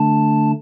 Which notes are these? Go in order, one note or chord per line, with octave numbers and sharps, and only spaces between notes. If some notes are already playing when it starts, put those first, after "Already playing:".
Already playing: D3 A3 D4 A5